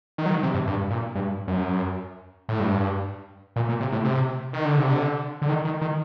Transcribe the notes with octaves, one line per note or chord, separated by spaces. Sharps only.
D#3
F#3
D#3
C3
G2
G2
A#2
G2
F#2
A2
G2
A#2
A#2
C3
A2
C3
D#3
D3
C3
D3
D3
D#3
D#3
D#3